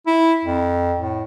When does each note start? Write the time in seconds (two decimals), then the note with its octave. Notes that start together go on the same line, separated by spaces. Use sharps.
0.07 E4
0.45 F2
0.98 A2